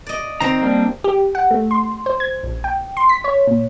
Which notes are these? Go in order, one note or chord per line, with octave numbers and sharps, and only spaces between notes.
D5 D#5
D#3 C4 C5 A#5
G3 A#3 D4
G4
F#5
A3
C6
C5
G#6
A#1
G5
C6
B6
C#5
A#2